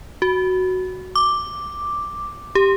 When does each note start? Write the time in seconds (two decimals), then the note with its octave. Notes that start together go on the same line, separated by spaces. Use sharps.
0.22 F#4
1.15 D6
2.55 G4